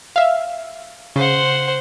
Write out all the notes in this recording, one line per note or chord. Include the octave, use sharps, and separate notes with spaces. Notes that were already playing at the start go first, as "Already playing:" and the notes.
E5 F5
C#3 C5 F#5